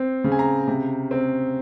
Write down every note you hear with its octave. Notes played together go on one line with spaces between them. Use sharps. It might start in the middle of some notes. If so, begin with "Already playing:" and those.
Already playing: C4
C#3
G#5
A#5
C3
C4